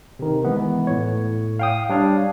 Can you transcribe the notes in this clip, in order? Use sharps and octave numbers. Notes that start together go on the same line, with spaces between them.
C3 D#3
E3 G#3 B3
A2 C#5
F5 G5 D#6
G3 D4 C#5 F5